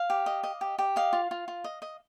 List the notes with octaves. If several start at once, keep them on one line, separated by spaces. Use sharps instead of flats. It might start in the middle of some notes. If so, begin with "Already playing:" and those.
Already playing: F5
G4
D#5
D#5
G4
G4
D#5 F5
F4
F4
F4
D#5
D#5